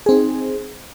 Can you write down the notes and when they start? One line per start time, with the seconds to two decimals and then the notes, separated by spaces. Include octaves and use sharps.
0.06 G#4
0.09 C4
0.11 D#4